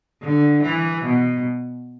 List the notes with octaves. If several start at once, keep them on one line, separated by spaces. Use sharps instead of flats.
D3
E3
B2